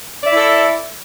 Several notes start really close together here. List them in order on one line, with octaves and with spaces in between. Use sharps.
D5 E5 E4 A4